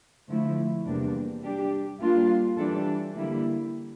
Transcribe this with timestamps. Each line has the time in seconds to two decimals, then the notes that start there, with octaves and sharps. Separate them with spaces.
0.28 D3 F3 A3 E4
0.85 E2 C3 G3 A#3 D4
1.42 G3 D4 G4
2.00 G3 A#3 D4 F4
2.56 E3 G3 D4 A4
3.14 D3 G3 A#3 E4